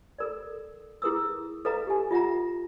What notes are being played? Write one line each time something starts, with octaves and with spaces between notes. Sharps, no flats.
A4 A#4 D5
E4 G#4 A#4 B4 D#6 E6
A4 B4 D#5 F5 A#5
G4 G#5
F4 E5 F#5 A#5